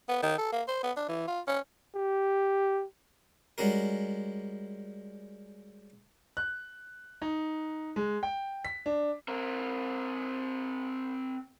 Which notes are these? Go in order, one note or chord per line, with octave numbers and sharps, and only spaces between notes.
B3
D#3
A4
A#3
C5
B3
D4
E3
F4
C#4
G4
G3 G#3 C#4 F#4 A#4
F#6
D#4
G#3
G5
B6
D4
C4 A#4